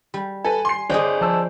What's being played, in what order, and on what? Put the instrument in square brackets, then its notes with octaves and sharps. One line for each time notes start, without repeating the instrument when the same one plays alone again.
[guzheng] G3
[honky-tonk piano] A4 B4 [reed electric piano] G#5
[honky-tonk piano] C6 C7
[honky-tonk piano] G1 [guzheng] G#4 D#5 G5 [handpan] C5 D5
[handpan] F3 [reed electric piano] C5 A5 E6